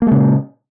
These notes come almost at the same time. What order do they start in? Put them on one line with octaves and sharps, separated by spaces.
A#3 G#3 C#3 A#2